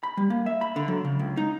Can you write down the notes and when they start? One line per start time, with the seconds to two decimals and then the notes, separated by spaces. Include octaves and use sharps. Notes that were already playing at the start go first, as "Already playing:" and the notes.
0.03 B5
0.17 G3
0.30 A#3
0.46 E5
0.61 B5
0.76 D3
0.88 F#3
1.05 C#3
1.19 C#2
1.37 D#4